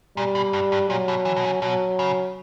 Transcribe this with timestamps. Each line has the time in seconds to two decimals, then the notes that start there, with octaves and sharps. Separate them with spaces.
0.17 A#2 G3
0.35 B2
0.53 G2
0.72 G2
0.90 A#2 F#3
1.08 B2
1.25 E3
1.36 B2
1.44 C#3
1.62 B2 F#3
1.99 C#3